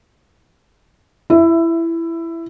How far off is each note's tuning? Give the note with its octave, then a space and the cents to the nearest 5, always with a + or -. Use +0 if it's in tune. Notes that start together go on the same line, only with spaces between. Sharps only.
E4 +15 E5 +0